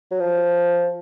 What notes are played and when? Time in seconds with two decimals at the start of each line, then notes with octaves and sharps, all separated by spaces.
0.11 F#3
0.20 F3